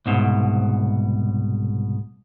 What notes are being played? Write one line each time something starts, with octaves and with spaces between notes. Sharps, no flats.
C2 G#2 B2